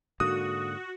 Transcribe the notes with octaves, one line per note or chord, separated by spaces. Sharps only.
G#2 D3 A#3 F#4 D#6